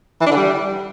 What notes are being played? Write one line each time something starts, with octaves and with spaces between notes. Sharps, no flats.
E3
D4
D3
G3